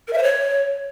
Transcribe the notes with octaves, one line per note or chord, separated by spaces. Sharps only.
A#4
E5
C5
C#5